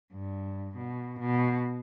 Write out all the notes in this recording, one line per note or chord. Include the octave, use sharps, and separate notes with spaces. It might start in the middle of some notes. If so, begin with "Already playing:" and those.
G2
B2
B2